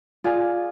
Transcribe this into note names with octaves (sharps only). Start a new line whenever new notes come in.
F4 G#4 D5 G#5